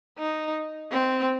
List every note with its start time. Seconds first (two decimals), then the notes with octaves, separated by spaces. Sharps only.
0.19 D#4
0.91 C4